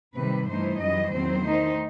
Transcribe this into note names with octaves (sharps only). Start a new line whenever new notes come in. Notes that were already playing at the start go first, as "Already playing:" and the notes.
C3 D#3 G3 B4
G2 E3 A3 D#4 C5
F#2 E3 G3 D#5
E2 D#3 F#3 C4 C5
D#3 A3 D#4